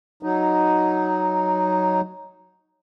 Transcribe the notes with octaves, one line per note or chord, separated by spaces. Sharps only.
F#3 D#4